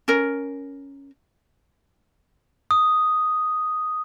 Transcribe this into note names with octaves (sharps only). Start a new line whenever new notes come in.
C#4 A#4
D#6